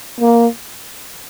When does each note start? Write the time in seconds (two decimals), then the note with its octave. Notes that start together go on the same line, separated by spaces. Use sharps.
0.20 A#3